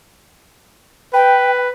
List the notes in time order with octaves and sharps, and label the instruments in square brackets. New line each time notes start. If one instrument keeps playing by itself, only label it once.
[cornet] B4 [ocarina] G5